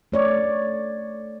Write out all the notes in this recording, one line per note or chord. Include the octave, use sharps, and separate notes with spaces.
A3 C#5 D5